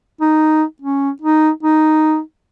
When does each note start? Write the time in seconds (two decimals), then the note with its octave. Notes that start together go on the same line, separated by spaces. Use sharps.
0.21 D#4
0.82 C#4
1.22 D#4
1.63 D#4